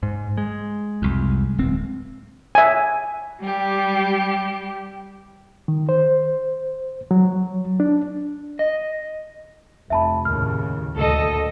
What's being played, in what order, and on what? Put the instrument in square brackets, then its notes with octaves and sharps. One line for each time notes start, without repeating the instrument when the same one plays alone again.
[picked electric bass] G#2
G#3
[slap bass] C2 F2
D1 C4
[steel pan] E5 G#5
[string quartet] G3 G4
[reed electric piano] D#3
C5
F#3
D4
[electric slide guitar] D#5
[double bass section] F1 [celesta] E5 A5 B5
[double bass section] D#2 A2 C#3 [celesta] F6
[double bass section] D2 A#2 [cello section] A4 D#5